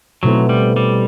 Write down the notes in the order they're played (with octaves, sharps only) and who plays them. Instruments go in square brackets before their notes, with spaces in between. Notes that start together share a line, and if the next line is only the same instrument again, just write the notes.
[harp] B2 A3 C4 E4 [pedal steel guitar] F#3
[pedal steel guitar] G3
G3